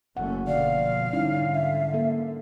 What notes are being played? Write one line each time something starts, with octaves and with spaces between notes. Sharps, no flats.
F#1 A3 C#4 F#5
B2 D3 F3 D5 F5
G#2 D3 G3 C#4 D#4 E4
E5
A#3 A4